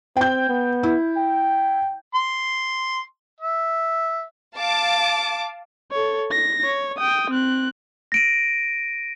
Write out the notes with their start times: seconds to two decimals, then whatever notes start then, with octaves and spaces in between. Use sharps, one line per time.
0.17 C4 G5 G6
0.49 B3
0.83 E4
1.17 G5
2.15 C6
3.41 E5
4.56 F5 A5 D6
5.92 A4 C#5
6.31 A#6
6.64 C#5
6.98 G5 D#6
7.30 C4 F#6
8.12 A#6 D7 D#7